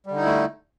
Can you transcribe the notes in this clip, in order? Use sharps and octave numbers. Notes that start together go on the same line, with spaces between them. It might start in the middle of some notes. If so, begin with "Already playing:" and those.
D3 G3 A3 D#4 E4